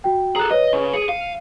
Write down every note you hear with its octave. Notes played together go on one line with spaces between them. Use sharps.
F#4 G5
G#4 A4 A#5 F#6
B4 C#5 D#5
C#3
G#4 C#7 D#7
F5